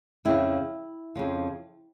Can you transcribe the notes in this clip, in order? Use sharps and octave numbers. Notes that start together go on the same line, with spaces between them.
F2 C#3 F3 E4
F2 C#3 F3